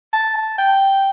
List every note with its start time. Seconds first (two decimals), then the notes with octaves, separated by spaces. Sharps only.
0.13 A5
0.36 A5
0.58 G5